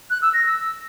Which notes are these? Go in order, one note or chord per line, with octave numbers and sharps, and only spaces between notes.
F#6
E6
A#6
E6